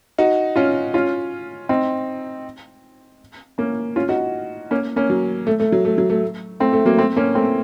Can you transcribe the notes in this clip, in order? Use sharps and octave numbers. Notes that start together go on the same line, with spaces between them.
D#4 F#4
C#4 F4
C#4 F4
C4 D#4
A#3 C#4
C#4 F4
D#4 F#4
A#3 C#4
A#3 C#4
F#3
A3
A3
F#3
A3
F#3
A3
A3 C4
A3
F#3 A#3
A3 C4
A#3 C#4
A3 C4